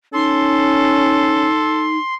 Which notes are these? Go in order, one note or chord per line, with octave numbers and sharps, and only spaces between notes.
C#4 D#4 A4 C6